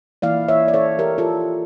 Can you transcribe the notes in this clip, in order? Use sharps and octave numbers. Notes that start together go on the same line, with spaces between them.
E3 A#3 E4 D5 F5
C#5 E5
D5
A4 C#5
G4 A#4
F4 A4